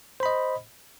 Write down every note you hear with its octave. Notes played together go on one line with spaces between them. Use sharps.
C5 D#5 B5